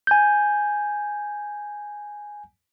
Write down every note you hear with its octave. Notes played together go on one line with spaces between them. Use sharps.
G#5 G6